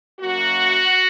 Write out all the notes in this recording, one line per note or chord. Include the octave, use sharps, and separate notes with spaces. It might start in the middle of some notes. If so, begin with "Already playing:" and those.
F#2 F#3 A#3 F#4